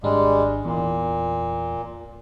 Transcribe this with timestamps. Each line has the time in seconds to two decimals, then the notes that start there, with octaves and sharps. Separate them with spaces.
0.03 G#1 G3 G#3 D4
0.65 E2 A#2